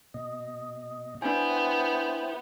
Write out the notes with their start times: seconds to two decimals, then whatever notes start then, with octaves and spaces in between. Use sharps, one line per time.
0.14 B2 D#5
1.22 B3 D4 E4 C5 G5 G#5